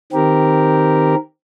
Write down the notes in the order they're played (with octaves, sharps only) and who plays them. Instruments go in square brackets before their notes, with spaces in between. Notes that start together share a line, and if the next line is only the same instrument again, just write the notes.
[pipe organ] D#3 C4 G4 A#4